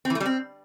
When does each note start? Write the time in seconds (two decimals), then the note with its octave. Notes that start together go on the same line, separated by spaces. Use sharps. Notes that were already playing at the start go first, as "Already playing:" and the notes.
0.05 C4
0.10 E3
0.15 A3
0.20 G3
0.26 C4